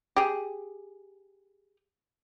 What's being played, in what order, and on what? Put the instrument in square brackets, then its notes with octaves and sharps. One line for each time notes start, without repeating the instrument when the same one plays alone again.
[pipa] G4 G#4